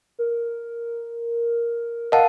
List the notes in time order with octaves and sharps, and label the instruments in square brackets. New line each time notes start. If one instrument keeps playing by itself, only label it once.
[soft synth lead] A#4
[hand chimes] A#4 A5 [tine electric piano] D#5 F5 F#5